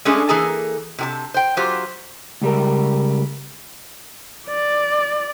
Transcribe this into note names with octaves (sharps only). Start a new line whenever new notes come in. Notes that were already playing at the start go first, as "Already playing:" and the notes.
G#3 A3 C#4 D4 G#4 A4
E3 A#3 G#4 A4 G#5 A#5
C3 G4 A5
C5 G5
F#3 F4 G4 C5
C#2 G3 A#4
D5